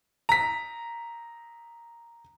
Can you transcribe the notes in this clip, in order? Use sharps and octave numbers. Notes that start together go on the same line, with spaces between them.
A#5 B6